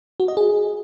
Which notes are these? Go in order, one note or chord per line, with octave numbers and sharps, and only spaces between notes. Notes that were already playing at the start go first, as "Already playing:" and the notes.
F#4
D#5
G#4